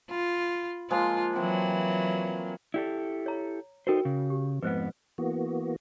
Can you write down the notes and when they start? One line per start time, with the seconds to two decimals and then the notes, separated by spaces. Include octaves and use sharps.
0.11 F4 B5
0.91 F3 G#3 A#3 F4
1.36 E3 F#3 C4 G5
2.74 E4 G4 A4 D5
3.26 C#5 A#5
3.87 D#4 F#4 A4 A#4 C5 G5
4.05 C#3
4.30 G4
4.63 F2 G#2 B3 B4 C5
5.18 E3 A#3 B3 F#4